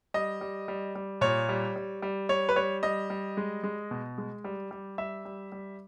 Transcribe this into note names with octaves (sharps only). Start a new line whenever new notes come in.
G3 D#5
G3
G3
G3
A#2 C#5
G3
G3
G3
G3 C#5
B4
G3 C#5
G3 D#5
G3
G#3
G#3
B2
G#3
G3
G3
G3 E5
G3
G3